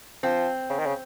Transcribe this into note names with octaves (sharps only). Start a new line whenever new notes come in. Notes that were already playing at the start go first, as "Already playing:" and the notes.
F3 C4
C#3
D#3
C#3